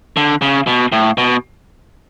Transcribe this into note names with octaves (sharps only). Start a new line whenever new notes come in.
D3
C#3
B2
A2
B2